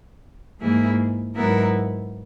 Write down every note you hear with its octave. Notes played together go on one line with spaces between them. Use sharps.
G#2 E3 A#3 E4 G#4
G#2 F#3 B3 E4 A#4